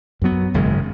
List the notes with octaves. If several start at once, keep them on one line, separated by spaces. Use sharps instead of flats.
F#2 F#3 B3
G#1 F#2 C#3 G#3